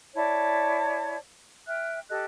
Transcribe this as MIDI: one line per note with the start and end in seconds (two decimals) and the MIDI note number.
0.15 1.17 64
0.15 1.17 73
0.15 1.17 74
0.15 1.17 81
1.67 2.00 76
1.67 2.00 79
1.67 2.00 89
1.67 2.00 90
2.10 2.25 67
2.10 2.25 69
2.10 2.25 75
2.10 2.25 90